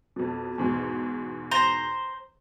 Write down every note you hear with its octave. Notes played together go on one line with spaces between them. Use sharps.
F2 B2
E2 G#2 B2
C5 A#5